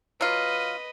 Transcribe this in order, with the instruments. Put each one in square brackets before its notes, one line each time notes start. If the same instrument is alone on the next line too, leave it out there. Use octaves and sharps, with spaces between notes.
[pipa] F#3 F4 [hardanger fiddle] B4 D#5